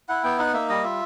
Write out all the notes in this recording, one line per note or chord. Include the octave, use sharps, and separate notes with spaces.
E4 F#5
B3 G5
D#4 F#5
A#3 E5
G3 D#5
F4 E5